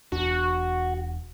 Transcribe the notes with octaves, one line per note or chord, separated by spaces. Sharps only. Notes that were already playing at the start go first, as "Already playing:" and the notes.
E1 E2 D4 F#4